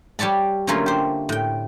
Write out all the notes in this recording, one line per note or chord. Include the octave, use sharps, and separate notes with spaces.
G3 C#5 D5 A5 B5
D3 F#3 A3 A#3 C#4 F4
G4 C5
A2 G5